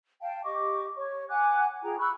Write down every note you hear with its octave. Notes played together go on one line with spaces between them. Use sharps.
F5 G5 A5
G4 D#5 C#6 D6
C#5 C#6
F#5 G#5 D6 F#6
F4 G#4 G5 A#5
B5 C#6 E6 F#6